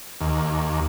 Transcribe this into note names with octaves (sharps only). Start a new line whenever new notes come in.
D#2